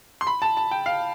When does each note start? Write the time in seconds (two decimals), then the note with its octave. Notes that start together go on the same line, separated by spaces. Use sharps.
0.21 C6
0.27 B5
0.42 A5
0.57 A5
0.71 G5
0.86 F5